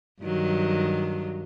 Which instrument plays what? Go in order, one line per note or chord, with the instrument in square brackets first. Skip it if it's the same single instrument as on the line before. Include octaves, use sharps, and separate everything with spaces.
[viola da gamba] G2 D#3 F#3